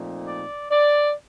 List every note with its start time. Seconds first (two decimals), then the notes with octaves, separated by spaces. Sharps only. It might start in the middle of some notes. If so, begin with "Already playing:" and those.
Already playing: A#2 F3 A3 C4 D#4
0.26 D5
0.71 D5